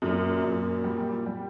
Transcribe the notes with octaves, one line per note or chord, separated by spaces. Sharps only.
F#2 A#2
F#2
G3
G3